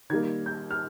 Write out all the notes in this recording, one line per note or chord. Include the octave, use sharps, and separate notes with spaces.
D#3 G3 A#3 G#6
G6
F6